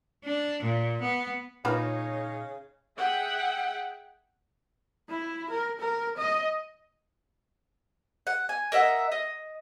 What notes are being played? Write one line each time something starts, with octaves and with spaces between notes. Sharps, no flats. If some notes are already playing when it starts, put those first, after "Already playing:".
D4
A#2
B3
A#2 C#3 A#3 D#4 F4 B4 C#5
G#4 E5 F#5 G5
E4
A#4
A#4
D#5
F#5
G#5
A#4 D#5 E5 F#5
D#5